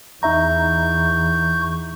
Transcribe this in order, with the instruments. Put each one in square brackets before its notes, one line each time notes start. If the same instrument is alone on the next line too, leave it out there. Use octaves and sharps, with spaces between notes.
[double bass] E2 [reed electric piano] D#4 E5 A#5 [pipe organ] C#6 G6